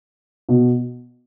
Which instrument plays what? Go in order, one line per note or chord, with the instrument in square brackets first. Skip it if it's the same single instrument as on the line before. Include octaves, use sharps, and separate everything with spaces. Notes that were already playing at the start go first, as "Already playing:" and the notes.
[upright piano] B2